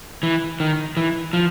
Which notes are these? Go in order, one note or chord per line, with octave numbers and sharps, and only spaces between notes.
E3
D#3
E3
F3